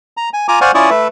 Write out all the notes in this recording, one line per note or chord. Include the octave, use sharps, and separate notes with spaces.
A#5
G#5
F4 G#5 A#5 D6
C5 D5 F5 F#5 G#5 C#6
C#4 E4 F4 D5 C#6 D#6
A3 B4 E5